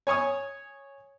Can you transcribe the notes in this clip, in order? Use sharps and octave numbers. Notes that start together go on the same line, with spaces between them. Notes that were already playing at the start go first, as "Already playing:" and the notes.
C#5 G#5 C#6 D#6